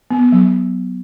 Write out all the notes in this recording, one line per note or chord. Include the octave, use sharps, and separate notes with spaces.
B3
F#3